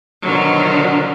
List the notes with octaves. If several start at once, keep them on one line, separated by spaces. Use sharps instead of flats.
B2 D3 D#3 F3 F#3